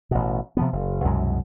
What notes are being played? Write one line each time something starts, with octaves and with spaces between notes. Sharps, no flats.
A1 B2
C3 F3 B3
F#1
C2 F#2 B2 G#3